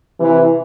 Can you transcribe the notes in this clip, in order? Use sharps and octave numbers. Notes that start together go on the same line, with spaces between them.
C3 E3